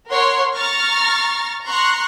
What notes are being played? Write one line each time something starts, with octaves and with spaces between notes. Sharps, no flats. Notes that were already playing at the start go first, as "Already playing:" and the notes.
A#4 C#5 F#5 C6
A#5 C#6 F6 A6 A#6
A#5 C6 C#6 F#6